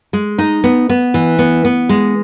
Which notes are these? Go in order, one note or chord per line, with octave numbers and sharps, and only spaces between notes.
G#3
D#4
B3
B3
E3
B3
B3
G#3